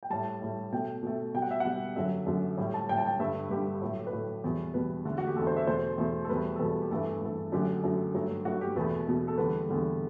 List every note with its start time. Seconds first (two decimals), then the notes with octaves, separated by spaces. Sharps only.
0.03 G5
0.10 A2 G3 A5
0.42 A2 G3
0.72 B2 A3 G5
1.03 B2 A3
1.34 B2 G3 G5
1.42 F#5
1.51 E5
1.60 B2 G3 F#5
1.96 F#2 D3 F#3 E5
2.26 F#2 D3 F#3
2.57 A2 G3
2.74 A5
2.89 A2 G3 G5
2.97 A5
3.06 G5
3.19 G2 D3 G3 E5
3.50 G2 D3 G3 G4
3.82 A2 F#3 A3
4.07 B4
4.12 A2 F#3 A3 A4
4.44 E2 B2 G3
4.74 E2 B2 G3 B4
5.05 E2 D3 A3
5.18 F#4
5.27 G4
5.36 E2 D3 A3 A4
5.47 C5
5.57 E5
5.67 E2 B2 A3 C5
5.98 E2 B2 A3
6.25 A4
6.29 E2 B2 G3 B4
6.56 A4
6.59 E2 B2 G3 B4
6.81 G4
6.91 G2 E3 A3 A4
7.21 G2 E3 A3
7.52 F#2 D3 F#3 A3 G4
7.83 F#2 D3 F#3 A3
8.14 G2 F#3 A3
8.45 G2 F#3 A3 F#4
8.61 G4
8.76 E2 B2 A3 B4
9.08 E2 B2 A3
9.28 A4
9.38 E2 D3 G3 B4
9.69 E2 D3 G3